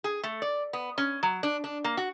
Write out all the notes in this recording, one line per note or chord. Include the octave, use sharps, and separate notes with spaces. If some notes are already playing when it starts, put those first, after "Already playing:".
G#4
A3
D5
B3
C#4
F#3
D4
D4
A#3
F#4